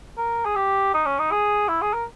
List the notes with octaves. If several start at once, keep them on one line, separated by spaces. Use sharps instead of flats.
A#4
G#4
G4
D#4
C#4
D#4
G#4
E4
G#4
A#4